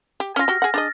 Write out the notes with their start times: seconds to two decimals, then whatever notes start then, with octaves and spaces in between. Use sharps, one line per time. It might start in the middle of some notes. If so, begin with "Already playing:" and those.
0.20 G4
0.36 C#4 F4 F6 A#6
0.48 F#4 G4
0.62 G#4 F#5
0.74 D4 G#4 D#5 A6